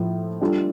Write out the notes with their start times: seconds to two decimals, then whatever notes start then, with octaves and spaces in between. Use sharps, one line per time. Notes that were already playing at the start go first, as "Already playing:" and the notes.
Already playing: A2 F3 A3
0.41 G3 D4 F4 A4